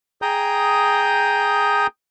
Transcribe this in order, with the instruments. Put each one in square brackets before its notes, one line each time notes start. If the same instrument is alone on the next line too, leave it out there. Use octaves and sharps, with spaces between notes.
[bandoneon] G#4 G5 A#5 D#6 G6